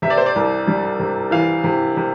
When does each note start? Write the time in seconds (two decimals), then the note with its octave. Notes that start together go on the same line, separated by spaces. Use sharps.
0.02 C3 E5
0.10 D5
0.17 C5
0.26 D5
0.35 C2
0.67 G3
0.99 C3
1.31 E3 F5
1.64 C3
1.97 C3